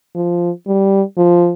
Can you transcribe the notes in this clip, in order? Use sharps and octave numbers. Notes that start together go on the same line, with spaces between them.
F3
G3
F3